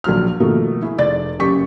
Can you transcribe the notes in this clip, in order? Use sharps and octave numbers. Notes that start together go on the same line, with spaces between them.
A#1 F#3 F6
B2 D#3 F3 A3 A#3
E4 G#4
F1 D5 A6
F#1 C#3 G4 C#6 B6